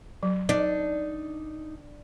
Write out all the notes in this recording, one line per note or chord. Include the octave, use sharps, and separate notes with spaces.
F#3
D4 D#4